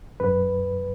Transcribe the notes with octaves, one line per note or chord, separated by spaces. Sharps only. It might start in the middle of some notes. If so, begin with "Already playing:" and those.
F#2 B4